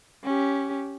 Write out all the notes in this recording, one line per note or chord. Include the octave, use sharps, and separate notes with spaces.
C#4 G4